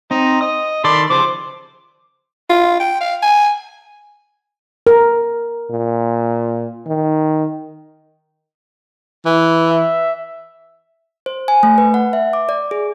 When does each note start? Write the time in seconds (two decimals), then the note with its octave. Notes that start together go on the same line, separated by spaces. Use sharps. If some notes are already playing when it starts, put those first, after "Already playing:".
0.11 C4 D#4
0.41 D#5 D#6
0.84 D#3 A4 D5 B5 C6 D6
1.10 C#3 F3 B4 C5 D6
2.50 F4
2.80 G5
3.01 F5
3.23 G#5
4.87 A#4
5.70 A#2
6.86 D#3
9.26 E3
9.71 E5
11.26 C5
11.48 G#5
11.63 A3
11.78 B4
11.94 F#5
12.13 E5
12.33 D6
12.49 D5
12.71 G#4